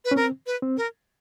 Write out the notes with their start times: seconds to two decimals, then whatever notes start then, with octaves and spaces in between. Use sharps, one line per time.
0.05 B4
0.11 C#4
0.16 C4 A#4
0.47 B4
0.62 C4
0.77 A#4